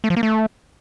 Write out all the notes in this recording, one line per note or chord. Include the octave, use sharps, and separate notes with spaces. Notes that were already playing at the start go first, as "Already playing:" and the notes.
A3
F3
A#3
A3